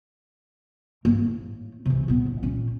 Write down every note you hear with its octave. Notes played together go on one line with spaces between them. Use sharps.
G#2 A#3
A2
C3 E3
A#2 B3
A1
A#2 C#4